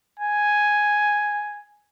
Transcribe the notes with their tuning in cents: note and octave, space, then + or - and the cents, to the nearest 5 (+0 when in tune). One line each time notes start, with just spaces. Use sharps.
G#5 +0